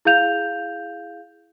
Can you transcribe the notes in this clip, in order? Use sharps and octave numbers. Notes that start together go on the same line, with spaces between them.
E4 G#4 F5 G6 F7